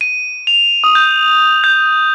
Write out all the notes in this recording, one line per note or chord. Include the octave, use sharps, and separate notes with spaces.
D#7
F7
D#6
G6
G6